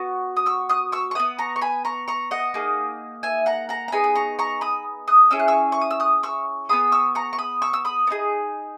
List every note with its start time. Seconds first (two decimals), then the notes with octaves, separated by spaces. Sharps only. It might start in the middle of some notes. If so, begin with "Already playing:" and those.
Already playing: B3 F#4 C#6
0.37 D#6
0.46 C#6 E6
0.69 D#6 F#6
0.92 C#6 E6
1.11 C#6
1.15 F#4 B5 D#6
1.19 B3
1.39 A#5 C#6
1.56 C#6
1.62 G#5 B5
1.85 A#5 C#6
2.08 A#5 C#6
2.31 D#5 F#5
2.54 A#3 D#4 G#4
3.23 E5 G#5
3.46 F#5 A#5
3.69 F#5 A#5
3.88 A#5
3.92 B3 D#4 G#4 G#5 B5
4.04 B5
4.16 A#5 C#6
4.39 A#5 C#6
4.61 B5 D#6
5.08 D#6 F#6
5.31 C#4 E4 G#4 E6
5.40 F#6
5.48 C#6 E6
5.72 C#6
5.81 D#6
5.91 E6
6.00 D#6 F#6
6.23 C#6 E6
6.69 B3 E4 G#4 B5 D#6
6.92 C#6 E6
7.15 A#5 C#6
7.33 C#6
7.39 B5 D#6
7.62 C#6 E6
7.73 E6
7.85 B5 D#6
8.07 B3
8.10 D#4 G#4